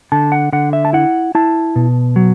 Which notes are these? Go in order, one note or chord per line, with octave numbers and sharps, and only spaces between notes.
D3 A5
F#5
D3 F#5
E5
A5
E4 F#5
E4 A5
B2
F#3